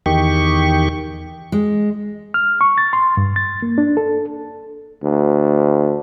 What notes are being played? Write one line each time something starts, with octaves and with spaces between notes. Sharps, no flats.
E2 D#3 G4 C#6
G#3
F6
C#6
A6
C6
G2
A6
A#3
D4
A4
D2